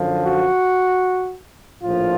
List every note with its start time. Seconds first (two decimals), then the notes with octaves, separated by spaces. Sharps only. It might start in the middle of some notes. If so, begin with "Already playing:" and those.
Already playing: F#2 D3 F3
0.27 F#4
1.83 A#1 A2 F3 F4